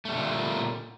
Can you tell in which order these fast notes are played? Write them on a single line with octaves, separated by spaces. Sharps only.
A3 G3 D#3 D3 A#2